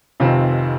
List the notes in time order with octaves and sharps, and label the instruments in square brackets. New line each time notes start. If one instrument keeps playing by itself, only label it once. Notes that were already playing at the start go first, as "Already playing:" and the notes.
[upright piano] F1 F2 D#3 C4 F4 [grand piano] C3